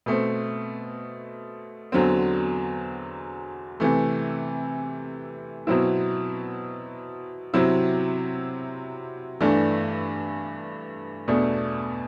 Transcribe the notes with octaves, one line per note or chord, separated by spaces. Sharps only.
B2 A3 C4
E2 D3 F#3 C4
C3 E3 A3
B2 F#3 C4 E4
C3 F#3 C4 E4
G2 E3 A3 D4
E2 B2 A3 D4